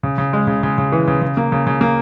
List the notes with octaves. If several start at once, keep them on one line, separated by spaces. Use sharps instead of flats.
C#3
C#3
G#3
C#3
C#3
C#3
E3
C#3
C#3
A#3
C#3
C#3
A#3